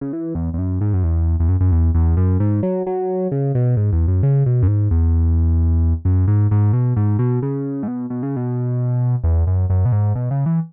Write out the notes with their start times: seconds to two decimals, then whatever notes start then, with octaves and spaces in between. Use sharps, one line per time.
0.01 C#3
0.13 E3
0.35 E2
0.54 E2
0.58 F#2
0.81 G#2
0.94 F#2
1.04 E2
1.40 E2
1.49 F#2
1.61 F#2
1.72 E2
1.95 E2
2.17 F#2
2.40 G#2
2.63 F#3
2.87 F#3
3.32 C#3
3.55 B2
3.77 G#2
3.92 E2
4.08 F#2
4.23 C#3
4.46 B2
4.63 F#2
4.68 G#2
4.91 E2
6.05 F#2
6.28 G#2
6.51 G#2
6.73 B2
6.96 G#2
7.19 B2
7.42 C#3
7.83 G#2
7.88 B2
8.10 B2
8.23 C#3
8.36 B2
9.24 E2
9.47 F#2
9.70 F#2
9.85 B2
9.92 G#2
10.15 B2
10.31 C#3
10.46 E3